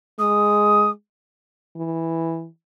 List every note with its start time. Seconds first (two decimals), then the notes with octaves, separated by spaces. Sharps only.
0.19 G#3 D#6
1.76 E3